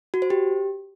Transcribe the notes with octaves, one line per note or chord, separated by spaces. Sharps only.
F#4
C5
G4